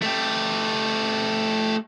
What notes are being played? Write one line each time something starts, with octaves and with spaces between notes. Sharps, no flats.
A3 G4